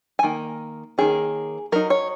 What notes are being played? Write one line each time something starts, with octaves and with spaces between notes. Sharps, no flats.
G#5
D#3 A#3
D#3 A#3 C#4 G#4
F#3 D#4 A#4
C#5